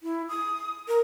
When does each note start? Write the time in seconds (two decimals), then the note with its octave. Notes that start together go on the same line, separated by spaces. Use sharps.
0.03 E4
0.29 D#6
0.88 A#4